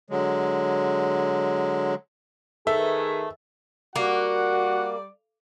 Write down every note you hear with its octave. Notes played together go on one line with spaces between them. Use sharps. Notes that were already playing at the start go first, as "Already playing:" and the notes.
D3 F#3 G#3
D#3 A3 G#4 A4 B4 E5
G3 A#3 F#4 D5 F#5